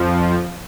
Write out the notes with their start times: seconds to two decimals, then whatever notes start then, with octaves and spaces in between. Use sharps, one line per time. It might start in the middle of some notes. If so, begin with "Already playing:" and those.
Already playing: F2 F3